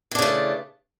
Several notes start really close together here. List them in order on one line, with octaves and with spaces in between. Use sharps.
E3 D4 C#3 A3